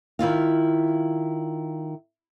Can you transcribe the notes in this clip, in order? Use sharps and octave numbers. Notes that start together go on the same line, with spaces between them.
D#3 E4 F4 F5